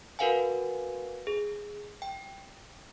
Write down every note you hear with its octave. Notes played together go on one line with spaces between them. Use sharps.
F#4 A#4 B4 F5 F#5 G#5
G#4
G5